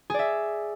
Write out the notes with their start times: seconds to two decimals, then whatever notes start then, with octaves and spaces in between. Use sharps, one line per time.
0.10 G#4
0.14 D5
0.19 E5